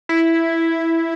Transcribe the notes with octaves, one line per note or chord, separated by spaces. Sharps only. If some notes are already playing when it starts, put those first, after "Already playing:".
E4